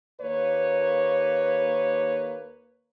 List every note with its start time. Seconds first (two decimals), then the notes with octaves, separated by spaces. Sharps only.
0.21 D#2 A#3 B4 C#5